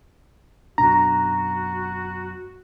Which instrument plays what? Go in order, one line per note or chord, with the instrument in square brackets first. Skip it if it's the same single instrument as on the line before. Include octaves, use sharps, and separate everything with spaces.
[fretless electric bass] F#2 B2 D4 [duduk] F#4 [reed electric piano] A#5